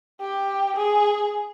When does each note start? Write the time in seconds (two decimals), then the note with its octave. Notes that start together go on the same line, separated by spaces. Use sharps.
0.20 G4
0.76 G#4